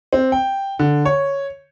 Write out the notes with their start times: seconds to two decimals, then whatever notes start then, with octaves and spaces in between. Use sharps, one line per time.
0.13 C4
0.32 G5
0.79 D3
1.05 C#5